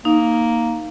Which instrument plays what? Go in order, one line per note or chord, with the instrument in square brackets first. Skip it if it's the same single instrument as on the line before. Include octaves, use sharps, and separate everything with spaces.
[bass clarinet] A#3 [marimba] D#4